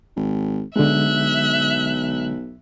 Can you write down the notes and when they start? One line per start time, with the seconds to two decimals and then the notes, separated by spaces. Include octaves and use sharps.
0.16 G#1
0.76 B1 D3 G#3 E5 F#6